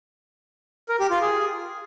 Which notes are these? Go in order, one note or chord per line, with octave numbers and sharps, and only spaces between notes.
A#4
G4
F4
G#4